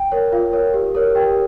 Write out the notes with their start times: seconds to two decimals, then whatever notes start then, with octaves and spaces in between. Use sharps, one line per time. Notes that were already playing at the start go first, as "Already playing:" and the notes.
Already playing: G5
0.12 A#4 C#5
0.32 F4 F5
0.53 A#4 C#5
0.74 G4
0.95 A#4 C#5
1.15 G4 G5